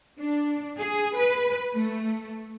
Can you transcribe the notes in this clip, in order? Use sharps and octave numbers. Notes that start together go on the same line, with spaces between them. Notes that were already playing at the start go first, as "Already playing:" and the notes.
D4
G#4
B4
A3